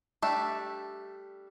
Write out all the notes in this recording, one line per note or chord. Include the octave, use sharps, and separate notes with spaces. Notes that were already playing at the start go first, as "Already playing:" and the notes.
G3 A3 D4 E5